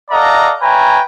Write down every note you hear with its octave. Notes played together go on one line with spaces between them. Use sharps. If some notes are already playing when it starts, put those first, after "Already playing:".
A4 D5 D#5 F5 F#5 A#5
B4 C#5 E5 G5 G#5 A#5